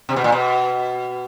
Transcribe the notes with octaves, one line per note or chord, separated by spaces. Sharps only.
C3
B2
A#2
B2